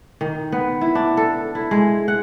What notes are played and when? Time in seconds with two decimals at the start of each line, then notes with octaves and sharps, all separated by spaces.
0.21 D#3
0.52 B3
0.81 E4
0.95 D4
1.17 A4
1.55 E4
1.71 G#3
2.08 F#5